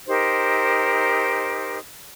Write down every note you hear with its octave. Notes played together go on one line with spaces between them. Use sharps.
D#4 G4 A#4 C5